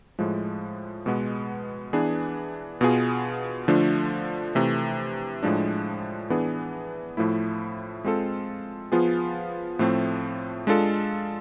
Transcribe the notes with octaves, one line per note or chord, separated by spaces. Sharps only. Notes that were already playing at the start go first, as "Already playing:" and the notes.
A2 F3 G#3
B2 G#3 B3
E3 B3 D4 G#4
B2 B3 F4 G#4
D3 F3 A3 D4 F4
C3 E3 A3
A2 F3 G#3 D4
E3 B3 D4 G#4
A2 F3 A3 E4
G#3 C4 F4 A4
F3 B3 F4 G#4
A2 F3 A3 C4
G#3 D4 F4 A4